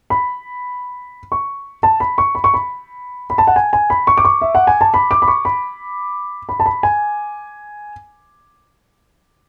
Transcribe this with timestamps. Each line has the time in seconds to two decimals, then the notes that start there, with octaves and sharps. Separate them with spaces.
0.10 B5
1.32 C#6
1.83 A5
2.00 B5
2.18 C#6
2.35 B5
2.44 C#6
2.54 B5
3.30 B5
3.38 A5
3.47 F#5
3.56 G#5
3.73 G#5
3.90 B5
4.07 C#6
4.18 D6
4.25 C#6
4.41 E5
4.55 F#5
4.67 G#5
4.81 A5
4.94 B5
5.11 D6
5.22 B5
5.28 C#6
5.45 B5
6.49 B5
6.60 A5
6.66 B5
6.83 G#5